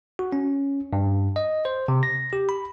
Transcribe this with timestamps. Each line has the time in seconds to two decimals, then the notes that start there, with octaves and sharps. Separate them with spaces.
0.19 F#4
0.32 C#4
0.93 G2
1.36 D#5
1.65 C5
1.88 C3
2.03 A#6
2.33 G4
2.49 B5